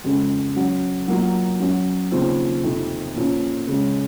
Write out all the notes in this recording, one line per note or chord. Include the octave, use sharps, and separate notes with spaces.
F2 C#3 G#3 C#4
F#3 C#4 F#4
F#3 A#3 F4
F#3 C#4 F#4
D#2 C#3 F3 C4
F2 C3 D#3
A#2 F3 A#3 C#4
C#3 G#3 C#4